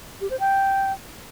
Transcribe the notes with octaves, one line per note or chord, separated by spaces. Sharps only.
G4
C5
G5